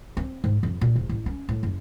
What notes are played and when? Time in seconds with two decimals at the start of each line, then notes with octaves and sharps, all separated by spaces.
0.17 C4
0.44 G#2
0.63 F2
0.81 A#2
0.95 D1
1.09 A1
1.26 C#4
1.49 A2
1.63 F#1